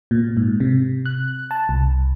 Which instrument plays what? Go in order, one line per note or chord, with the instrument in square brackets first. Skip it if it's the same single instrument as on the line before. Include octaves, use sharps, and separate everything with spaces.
[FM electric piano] A#2
G#2
C3
F#6
A5
C2